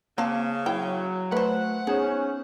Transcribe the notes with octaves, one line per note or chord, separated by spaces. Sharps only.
C#3 A#3 C4 F5 A5
F#3 E4 G5
A3 B4 C5 F#5
B3 C#4 D#4 G#4 C5